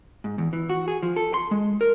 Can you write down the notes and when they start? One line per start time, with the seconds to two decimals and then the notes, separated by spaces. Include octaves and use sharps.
0.24 G#2
0.38 E2
0.53 E3
0.70 F#4
0.88 G#4
1.03 F3
1.16 A4
1.34 C6
1.51 G#3
1.81 A#4